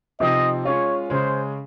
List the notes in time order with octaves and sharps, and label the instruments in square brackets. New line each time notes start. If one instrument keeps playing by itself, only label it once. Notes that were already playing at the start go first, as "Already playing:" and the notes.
[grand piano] C3 F3 C4 D#4 [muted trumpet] D#5
[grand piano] G#3 C#4 F4 [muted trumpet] C#5
[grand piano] C#3 G#3 C#4 [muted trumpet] C5